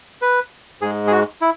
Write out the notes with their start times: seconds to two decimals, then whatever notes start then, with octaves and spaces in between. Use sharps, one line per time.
0.22 B4
0.81 G#2 G#3 G#4
1.07 G#4
1.11 F#4
1.41 E4